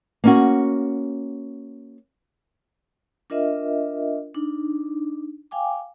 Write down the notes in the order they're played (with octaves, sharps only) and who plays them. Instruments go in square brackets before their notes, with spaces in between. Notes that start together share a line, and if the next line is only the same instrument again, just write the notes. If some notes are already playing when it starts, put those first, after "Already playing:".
[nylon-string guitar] A#3 C#4 F#4
[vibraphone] D4 F4 A#4 D#5 E5
D4 D#4
F5 G5 G#5 D6